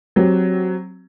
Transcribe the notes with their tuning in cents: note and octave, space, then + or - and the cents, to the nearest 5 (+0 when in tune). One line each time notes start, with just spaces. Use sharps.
F#3 +0 C4 +10 G4 +0